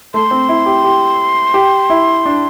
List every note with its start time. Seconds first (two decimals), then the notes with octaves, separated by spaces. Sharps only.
0.14 A3 C6
0.31 C4
0.48 E4
0.66 G4
0.84 G4
1.54 G4
1.90 E4
2.26 D4